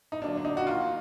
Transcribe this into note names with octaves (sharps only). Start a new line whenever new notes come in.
D#4
D3 F#3 A#3 D4
D4
D#4
F#4
D#3 A#3 F4